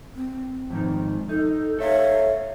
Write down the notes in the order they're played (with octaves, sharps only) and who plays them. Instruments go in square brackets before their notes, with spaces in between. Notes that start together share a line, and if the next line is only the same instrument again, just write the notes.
[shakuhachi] C4
[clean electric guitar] F2 G#2 D#3
[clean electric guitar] D#4 [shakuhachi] A4
[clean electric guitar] A4 E5 F5 [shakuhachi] C#5